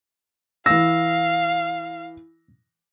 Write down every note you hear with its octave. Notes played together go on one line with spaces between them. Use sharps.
E3 F5 E6 A#6